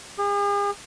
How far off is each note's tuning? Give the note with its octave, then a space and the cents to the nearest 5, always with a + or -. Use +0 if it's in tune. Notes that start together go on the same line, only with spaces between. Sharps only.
G#4 -45